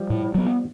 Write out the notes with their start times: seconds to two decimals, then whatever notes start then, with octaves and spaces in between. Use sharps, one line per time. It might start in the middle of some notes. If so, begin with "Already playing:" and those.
Already playing: F3 G3
0.10 A2
0.35 F#3 B3